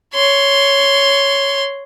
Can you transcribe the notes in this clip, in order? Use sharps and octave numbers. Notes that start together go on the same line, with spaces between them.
C#5 C6